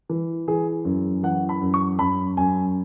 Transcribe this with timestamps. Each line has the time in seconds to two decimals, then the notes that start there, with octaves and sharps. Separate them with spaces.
0.09 E3
0.48 E3 G#4
0.85 F#2
1.23 E3 F#5
1.49 B5
1.61 F#2
1.74 C#6
1.99 F#2 B5
2.37 F#2 G#5